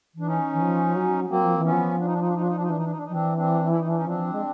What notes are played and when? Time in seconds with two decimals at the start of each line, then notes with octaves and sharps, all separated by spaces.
0.14 E3
0.20 D4
0.27 C#4 D#4
0.53 E3
0.61 F3
0.95 F#3
1.29 F#3 A#3 C4
1.43 F3
1.58 E3
1.65 B3 C#4
1.71 F3
1.99 D4
2.06 D#4
2.13 D4
2.21 D#4
2.27 D4
2.35 D#4
2.41 D4
2.49 D#4
2.56 D4
2.63 D#4
2.69 E3 D4
2.77 D#4
2.84 D4
2.91 D#4
2.97 D4
3.05 D#4
3.09 F3
3.12 E3 C4 D4
3.37 C4 D4
3.71 E4
3.80 D#4
3.87 D4
3.96 C#4 D#4
4.06 F3 C4 D4
4.32 G#3